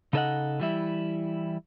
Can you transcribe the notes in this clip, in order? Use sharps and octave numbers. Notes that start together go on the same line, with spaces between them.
C#3 D#4 A4 C5 D#5 F#5
E3 G3 E4